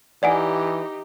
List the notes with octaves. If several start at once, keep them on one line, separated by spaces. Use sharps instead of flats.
E3 D#4 G4 D5 F#5 G#5